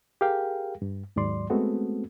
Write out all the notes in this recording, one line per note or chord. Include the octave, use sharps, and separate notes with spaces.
G4 G#4 A#4 F5 G5
G2
D#2 G#2 F#3 D5 C6
G#3 A3 B3 C4 F#4 A4